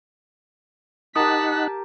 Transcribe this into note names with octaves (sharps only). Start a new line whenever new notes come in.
D#4 G4 A#4 F#5 A5 D#6 B6